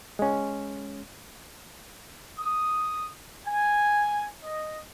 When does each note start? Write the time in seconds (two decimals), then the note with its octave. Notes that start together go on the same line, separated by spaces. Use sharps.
0.19 G#3 C#4
2.39 D#6
3.46 G#5
4.43 D#5